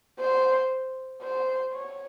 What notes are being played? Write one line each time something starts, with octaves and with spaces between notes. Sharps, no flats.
C5
C5
C#5